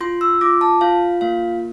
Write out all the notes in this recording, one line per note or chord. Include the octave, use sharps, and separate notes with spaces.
F4 C6
E6
F4 D6
A5
F4 F5
A#3 F5